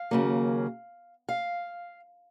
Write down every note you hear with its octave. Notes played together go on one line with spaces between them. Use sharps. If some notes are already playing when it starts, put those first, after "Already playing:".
Already playing: F5
D#2 C#3 F#3 A#3
F5